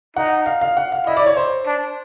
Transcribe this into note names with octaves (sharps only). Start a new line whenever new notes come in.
D#4 F#5
F5
F5
F#5
F5
E4 D#5
D5
C#5
C5
D4